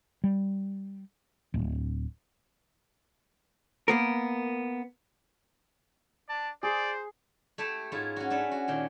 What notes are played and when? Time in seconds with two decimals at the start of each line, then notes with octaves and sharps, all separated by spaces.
0.24 G3
1.54 D1
3.88 A#3 B3 A#4
6.29 D4 D5 A5
6.63 G#4 C5 D5
7.58 A3 E4 G4 A4 A5
7.92 G#2 E4 F4 C#5
8.16 C#4 F#4
8.30 C#4 D4 A4 B4
8.51 F#4
8.68 A#2 D#3 G#4